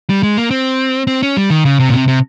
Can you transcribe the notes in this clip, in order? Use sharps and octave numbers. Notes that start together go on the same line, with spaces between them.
G3
G#3
A#3
C4
C4
C#4
G3
D#3
C#3
C3
A#2
C3
C3